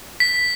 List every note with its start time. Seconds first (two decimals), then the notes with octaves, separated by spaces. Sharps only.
0.20 B6